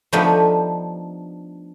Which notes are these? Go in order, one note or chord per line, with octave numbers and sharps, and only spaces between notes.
F3 A3 B3 D4 D#4 G4